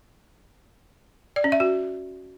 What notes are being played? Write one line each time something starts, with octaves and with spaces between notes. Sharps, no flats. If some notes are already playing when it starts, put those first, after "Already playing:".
D5
C#4
E5
F#4